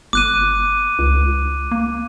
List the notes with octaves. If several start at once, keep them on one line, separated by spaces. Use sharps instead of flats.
G1 D6 F#6 D#7
C#2
A#3